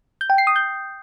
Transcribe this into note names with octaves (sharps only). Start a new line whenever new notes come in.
G6
G5
C7
D#6
G6